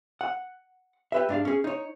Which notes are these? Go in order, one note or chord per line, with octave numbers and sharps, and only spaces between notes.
F#5
G4 B4 E5
G#2 D4 F5
C#4 G#4
D#4 C#5